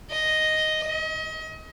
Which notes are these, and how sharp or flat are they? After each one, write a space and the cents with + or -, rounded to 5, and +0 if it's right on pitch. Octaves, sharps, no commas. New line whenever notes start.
D#5 +0
D#5 +35